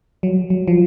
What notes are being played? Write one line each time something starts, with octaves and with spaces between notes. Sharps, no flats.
F#3
F#3
F3